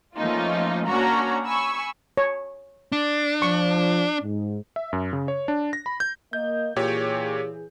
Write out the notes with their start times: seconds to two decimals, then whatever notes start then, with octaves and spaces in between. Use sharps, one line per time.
0.17 F3 A3 A#3 C#4 D#4 F4
0.87 A#3 C#4 D4 F#4 C#5 A#5
1.46 G#5 B5 C#6 E6
2.17 C#5
2.92 D4
3.42 F3 C#6
4.22 G#2
4.76 E5
4.93 F#2
5.13 C#3
5.28 C#5
5.48 D4
5.73 A#6
5.86 B5
6.00 G6
6.33 A#3 D#5 G6
6.76 A#2 E3 G4 G#4 C#5